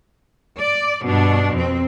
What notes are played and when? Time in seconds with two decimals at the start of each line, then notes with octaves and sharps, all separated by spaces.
0.59 D5
1.03 G2 B2 D4
1.54 F2 C4